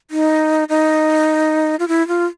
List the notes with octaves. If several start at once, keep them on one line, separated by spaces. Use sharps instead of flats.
D#4
D#4
F4
E4
F4